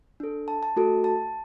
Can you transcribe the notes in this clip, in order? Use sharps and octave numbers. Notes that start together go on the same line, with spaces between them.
D4 A4
A5
A5
A3 F#4 A4
A5